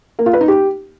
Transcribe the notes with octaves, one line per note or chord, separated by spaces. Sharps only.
A#3
F4
B4
D#4
G4